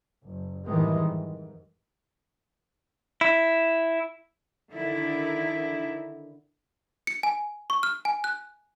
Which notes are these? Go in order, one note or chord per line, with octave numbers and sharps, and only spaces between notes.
F#1
F2 A2 D#3 E3 G3 G#3
G#2
E4
D3 D#3 E4
C#7
G#5
C#6
F6
G#5
F#6